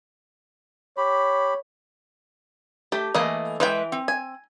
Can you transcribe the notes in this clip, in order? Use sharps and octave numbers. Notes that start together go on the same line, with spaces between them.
G4 C#5 B5
A3 G4
E3 A3 A#3 G#4 D#5
E3 G#3 B4 E5 G5
C4
G#5